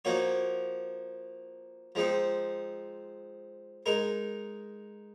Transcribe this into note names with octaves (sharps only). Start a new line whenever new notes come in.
F3 A#3 D#4 F#4 C#5
F3 G#3 C4 D#4
G#3 D#4 A#4